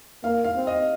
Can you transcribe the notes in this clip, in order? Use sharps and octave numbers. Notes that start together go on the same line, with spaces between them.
A#3 F5
F5
C4
D#5